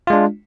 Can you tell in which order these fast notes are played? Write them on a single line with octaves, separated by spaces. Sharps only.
F4 G#3 D4